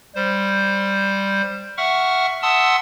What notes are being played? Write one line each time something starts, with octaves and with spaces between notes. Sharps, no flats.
G3 C5
E5 F#5 C#6 F6
E5 F#5 A5 C6 D#6 E6